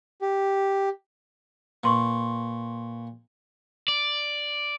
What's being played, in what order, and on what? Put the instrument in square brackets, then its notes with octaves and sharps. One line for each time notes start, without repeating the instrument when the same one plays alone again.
[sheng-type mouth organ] G4
[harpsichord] A#2 [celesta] B4 C6 C#6
[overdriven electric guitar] D5